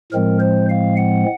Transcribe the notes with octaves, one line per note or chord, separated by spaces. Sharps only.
A2 F3 G#3 C4 A#4
C5
F5
F#5